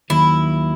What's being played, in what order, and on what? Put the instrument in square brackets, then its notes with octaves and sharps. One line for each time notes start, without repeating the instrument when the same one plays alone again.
[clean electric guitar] D#2 D#3 F#3 [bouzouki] E4